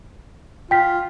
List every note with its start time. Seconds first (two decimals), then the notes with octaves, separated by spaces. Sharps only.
0.71 F4 G5 B6